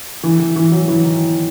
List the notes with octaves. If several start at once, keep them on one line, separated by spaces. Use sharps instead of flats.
E3
E3
E3
F#3
E3
D#3